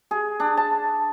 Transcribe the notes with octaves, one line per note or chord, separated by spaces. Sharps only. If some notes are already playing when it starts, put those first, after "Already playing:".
G#4
D4
A5